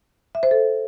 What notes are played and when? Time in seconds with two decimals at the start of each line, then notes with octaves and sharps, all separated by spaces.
0.35 E5
0.43 C5
0.51 A4